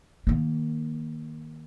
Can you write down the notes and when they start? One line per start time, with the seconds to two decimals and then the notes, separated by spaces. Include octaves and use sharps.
0.27 D#3 A#3